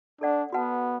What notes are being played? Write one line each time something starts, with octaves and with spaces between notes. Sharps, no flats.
D4 A4 D5 F#5
B3 F#4 B4 F#5 A5